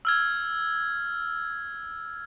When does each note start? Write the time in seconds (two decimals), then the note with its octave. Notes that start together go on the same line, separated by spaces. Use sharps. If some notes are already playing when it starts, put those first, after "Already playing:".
0.05 E6 F6 G#6